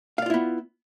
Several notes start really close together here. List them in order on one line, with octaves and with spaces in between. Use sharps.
F5 D5 F4 E4 B3